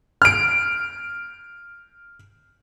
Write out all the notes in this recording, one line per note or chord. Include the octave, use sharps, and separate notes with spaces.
F6 D7